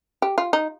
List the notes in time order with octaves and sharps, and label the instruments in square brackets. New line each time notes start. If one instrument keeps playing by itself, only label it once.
[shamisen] G4
F4
D#4